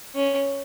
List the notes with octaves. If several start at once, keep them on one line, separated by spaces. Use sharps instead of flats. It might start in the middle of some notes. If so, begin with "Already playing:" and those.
C#4